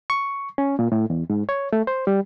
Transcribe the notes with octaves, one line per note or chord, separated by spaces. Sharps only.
C#6
C#4
A#2
A2
E2
G#2
C#5
A3
C5
G3